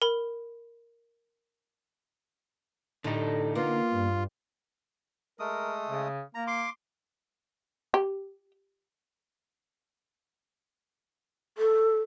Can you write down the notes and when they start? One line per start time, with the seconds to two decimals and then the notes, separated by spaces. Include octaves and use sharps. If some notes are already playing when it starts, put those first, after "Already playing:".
0.02 A#4 B5
3.04 A2 D3 G3 D#4
3.56 A#3 B3 F4
3.92 G2
5.39 G#3 A3 A#4 D#6
5.89 C#3
6.35 A#3 A#5
6.47 C6 D6
7.94 G4
11.58 A4